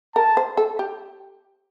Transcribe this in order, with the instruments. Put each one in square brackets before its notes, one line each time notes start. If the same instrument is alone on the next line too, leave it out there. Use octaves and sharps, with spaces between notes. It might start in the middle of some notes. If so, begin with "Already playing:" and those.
[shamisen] A#4 [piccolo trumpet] A5
[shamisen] C5
A4
G4